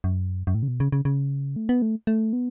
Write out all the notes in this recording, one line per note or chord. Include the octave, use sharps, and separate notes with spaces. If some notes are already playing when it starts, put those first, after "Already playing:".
F#2
F#2
A2
C#3
B2
C#3
C#3
C#3
A3
B3
A3
A3
B3